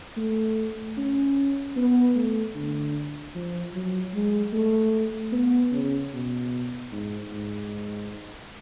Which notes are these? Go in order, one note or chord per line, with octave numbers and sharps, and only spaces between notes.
A3
C#4
B3
A3
D3
F3
F#3
G#3
A3
B3
C#3
B2
G#2
G#2